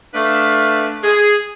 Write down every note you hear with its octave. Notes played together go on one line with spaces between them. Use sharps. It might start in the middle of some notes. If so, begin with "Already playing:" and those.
A3 D4 B4 E5 F5
G#4